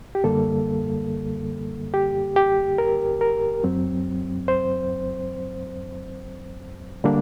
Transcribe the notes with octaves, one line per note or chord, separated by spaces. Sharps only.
G4
F#2 D3 G3 A#3 A4
G4
G4
A#4
A#4
F#2 F#3 C4
C5
D3 G3 A#3 D4